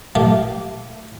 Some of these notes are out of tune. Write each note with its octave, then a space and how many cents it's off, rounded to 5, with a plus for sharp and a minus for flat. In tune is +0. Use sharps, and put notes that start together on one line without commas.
A3 +0 G4 -20 F5 +0